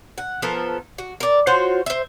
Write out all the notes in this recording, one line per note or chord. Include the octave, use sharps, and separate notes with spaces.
F#5
F3 B3 A4 A#4
F#4
A#4 D5
F4 F#4 C5 C#5
C5 E5